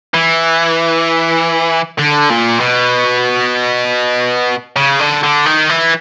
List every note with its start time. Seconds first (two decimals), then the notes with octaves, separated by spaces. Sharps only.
0.14 E3
1.99 D3
2.30 A#2
2.61 B2
4.76 C#3
4.99 D3
5.23 D3
5.46 D#3
5.69 E3